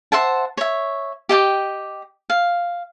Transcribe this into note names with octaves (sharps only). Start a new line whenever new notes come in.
C5 E5 F#5 A5
C#5 E5
G4 D#5 G5 D6
F5